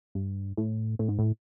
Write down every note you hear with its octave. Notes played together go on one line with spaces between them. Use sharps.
G2
A2
A2
G#2
A2